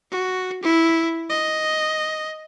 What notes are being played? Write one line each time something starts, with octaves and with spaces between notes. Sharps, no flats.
F#4
E4
D#5